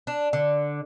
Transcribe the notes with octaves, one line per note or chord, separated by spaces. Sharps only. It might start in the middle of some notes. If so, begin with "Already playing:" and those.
D4
D3